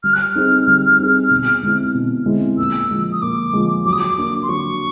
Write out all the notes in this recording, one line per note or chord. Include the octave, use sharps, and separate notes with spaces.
G3 F6
F#6
F6
C4 D#4 G#4
G3
C4 D#4 G#4
B2
G#3 C4 E4
B2
G#3 C4 E4
A#2 E6
F3 G#3
D#6
A#2 D6
F3 G#3
F#3 D6
D#6
D6
A#3 D4
C6
F#3 C#6